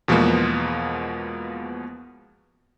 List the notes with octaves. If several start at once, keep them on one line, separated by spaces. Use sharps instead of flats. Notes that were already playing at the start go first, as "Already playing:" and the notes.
E2 B2 F3 G#3 A#3 B3